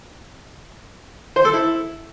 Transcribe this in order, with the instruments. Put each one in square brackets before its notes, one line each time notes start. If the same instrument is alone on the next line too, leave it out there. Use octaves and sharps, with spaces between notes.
[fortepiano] C5
A4
E4